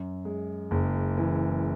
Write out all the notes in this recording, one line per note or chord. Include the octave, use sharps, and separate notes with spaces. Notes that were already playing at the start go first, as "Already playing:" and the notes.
Already playing: F#2
G#3
F#1
E3